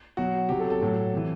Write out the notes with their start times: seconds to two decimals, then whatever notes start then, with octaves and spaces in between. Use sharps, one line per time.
0.17 B2 F#3 F#4
0.49 C3 F#3 G4
0.60 A4
0.70 A4
0.81 A2 F#3
1.13 C3 E3